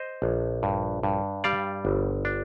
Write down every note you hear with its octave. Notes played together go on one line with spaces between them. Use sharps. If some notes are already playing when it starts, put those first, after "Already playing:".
Already playing: C5 D#5
A#1
G2
G2
G3 D5 F5
G1
D4